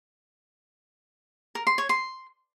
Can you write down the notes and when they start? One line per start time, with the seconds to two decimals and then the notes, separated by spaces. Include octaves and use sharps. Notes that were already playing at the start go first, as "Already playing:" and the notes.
1.55 A#4
1.67 C6
1.78 C#5
1.89 C6